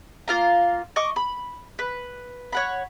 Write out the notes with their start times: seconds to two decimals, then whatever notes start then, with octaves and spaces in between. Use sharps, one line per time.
0.28 A#3 F4 F5 A#5
0.96 D#5 C#6 D6
1.16 B5
1.79 B4
2.53 C#5 F#5 B5